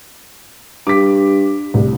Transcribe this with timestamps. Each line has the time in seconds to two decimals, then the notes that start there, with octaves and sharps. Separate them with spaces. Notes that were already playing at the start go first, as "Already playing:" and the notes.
0.87 G2 D6 B6
1.74 C2 A2